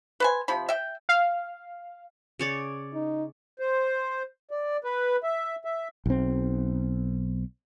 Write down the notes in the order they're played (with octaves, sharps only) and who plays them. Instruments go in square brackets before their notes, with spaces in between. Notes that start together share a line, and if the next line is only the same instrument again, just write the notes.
[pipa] B4 C5 G#5
C3 F3 B5
E5 G5
[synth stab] F5
[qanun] C#3 C#5 D5
[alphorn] D#4
[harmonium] C5
D5
B4
E5
E5
[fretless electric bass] B1 C4